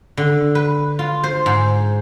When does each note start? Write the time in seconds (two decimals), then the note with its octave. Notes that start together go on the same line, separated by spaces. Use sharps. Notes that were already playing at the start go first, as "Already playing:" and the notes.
0.17 D3
0.55 B4
0.99 F4
1.24 C5
1.46 G#2